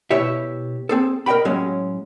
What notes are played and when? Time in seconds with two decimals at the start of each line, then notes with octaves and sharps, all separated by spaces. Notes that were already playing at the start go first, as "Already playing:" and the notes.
0.11 B2 E4 G4 C#5 E5
0.89 C4 G#4 A4
1.26 A#4 D#5 F5 G5 B5
1.45 A2 F#3 G#3 C#4